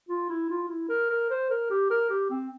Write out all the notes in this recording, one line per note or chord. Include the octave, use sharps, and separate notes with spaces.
F4
E4
F4
E4
A#4
A#4
C5
A#4
G4
A#4
G4
C4